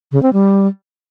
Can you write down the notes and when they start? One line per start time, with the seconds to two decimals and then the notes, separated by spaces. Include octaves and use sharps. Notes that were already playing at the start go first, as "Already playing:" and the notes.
0.12 C#3
0.23 C4
0.33 G3